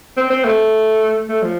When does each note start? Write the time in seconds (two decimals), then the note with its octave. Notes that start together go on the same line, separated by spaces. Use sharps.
0.17 C4
0.30 C4
0.45 A3
1.29 A3
1.43 F3